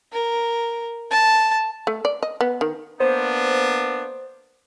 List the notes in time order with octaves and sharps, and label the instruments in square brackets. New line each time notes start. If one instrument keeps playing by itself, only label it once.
[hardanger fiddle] A#4
A5
[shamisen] A3
D5
D#5
B3
D#3
[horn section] A#3 B3 D4 [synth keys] C5